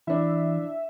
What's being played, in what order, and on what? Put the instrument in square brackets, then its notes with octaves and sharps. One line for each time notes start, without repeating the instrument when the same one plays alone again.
[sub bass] E3 [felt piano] D4 E4 [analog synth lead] E5